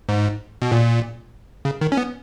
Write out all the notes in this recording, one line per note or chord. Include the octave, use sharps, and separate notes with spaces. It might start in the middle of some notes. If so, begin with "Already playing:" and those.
G#2
B2
A#2
C#3
D#3
C#4
B3